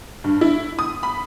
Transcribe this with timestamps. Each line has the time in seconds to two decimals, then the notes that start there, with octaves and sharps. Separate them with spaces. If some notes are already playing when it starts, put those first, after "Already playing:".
0.24 G2
0.41 E4
0.79 D#6
1.03 B5